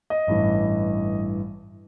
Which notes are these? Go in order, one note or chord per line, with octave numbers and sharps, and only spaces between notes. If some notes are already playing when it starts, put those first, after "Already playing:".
D#5
A1 G2 E3